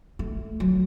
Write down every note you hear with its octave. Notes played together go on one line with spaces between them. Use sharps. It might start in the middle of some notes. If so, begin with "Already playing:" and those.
A3
F#3